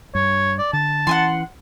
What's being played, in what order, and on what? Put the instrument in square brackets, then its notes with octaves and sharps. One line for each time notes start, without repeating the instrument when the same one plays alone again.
[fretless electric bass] G2 [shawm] C#5
[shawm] D5
[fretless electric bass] D3 [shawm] A5
[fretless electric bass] E3 C#4 [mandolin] F#5 G#5 C6